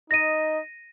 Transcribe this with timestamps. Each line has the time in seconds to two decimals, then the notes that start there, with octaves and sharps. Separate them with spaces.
0.11 D#4 D#5 A#6 D#7